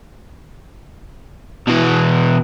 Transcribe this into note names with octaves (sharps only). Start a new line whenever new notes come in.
B2 E3